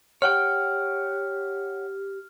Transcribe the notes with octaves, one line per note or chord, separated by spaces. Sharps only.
G4 C#5 F#5 G5 F6